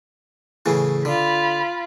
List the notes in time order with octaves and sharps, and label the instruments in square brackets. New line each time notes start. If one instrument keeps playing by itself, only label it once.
[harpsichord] A2 C#3 E3
[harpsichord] D3 [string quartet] F4 B5